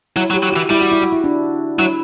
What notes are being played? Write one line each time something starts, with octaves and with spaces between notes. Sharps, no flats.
F#3 E4
F#3
G4
F#3
E3 F#4
G3 E4
F#4
E4
F#4
E4
D4
F#3 E4